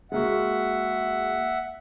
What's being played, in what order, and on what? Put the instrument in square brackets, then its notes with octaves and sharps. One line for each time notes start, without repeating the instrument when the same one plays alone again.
[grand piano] G#3 A#3 F#4 [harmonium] E5 F#5